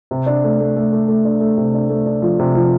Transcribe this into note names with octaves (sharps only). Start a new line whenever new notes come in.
C3
D4
A3
A3
A3
A3
A3
D4
A3
C3
D4
A3
D4
F3
C3
F3